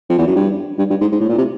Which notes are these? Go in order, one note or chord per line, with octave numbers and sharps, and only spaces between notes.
F2
E2
F#2
G2
G2
G2
G#2
G#2
A2
A#2
C3